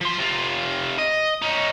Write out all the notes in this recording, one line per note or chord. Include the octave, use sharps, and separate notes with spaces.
F3 C6
C3 F4
D#5
C#4 D#4